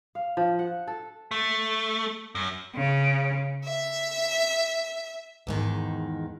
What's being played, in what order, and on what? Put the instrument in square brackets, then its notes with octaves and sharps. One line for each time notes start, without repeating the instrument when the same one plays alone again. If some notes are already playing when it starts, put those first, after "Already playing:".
[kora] F5
F3
F#5
A4
[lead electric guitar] A3
F#2
[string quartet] C#3
E5
[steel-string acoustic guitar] E2 G#2 D#3